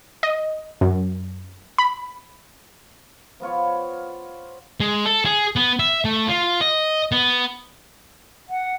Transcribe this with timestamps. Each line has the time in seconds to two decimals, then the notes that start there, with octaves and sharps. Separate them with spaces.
0.23 D#5
0.81 F#2
1.78 B5
3.40 F3 B3 F4 C#5
4.80 G#3
5.05 A4
5.25 G#4
5.56 B3
5.79 E5
6.05 A3
6.28 F4
6.61 D#5
7.12 B3
8.49 F#5